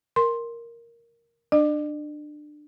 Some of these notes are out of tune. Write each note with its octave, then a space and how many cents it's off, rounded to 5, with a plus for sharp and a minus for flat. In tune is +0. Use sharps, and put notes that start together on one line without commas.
A#4 +0 C6 +5
D4 +25 D5 +45